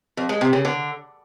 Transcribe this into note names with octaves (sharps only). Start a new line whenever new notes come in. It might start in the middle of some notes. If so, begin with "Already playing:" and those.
F2
G#3
C3
C#3
D3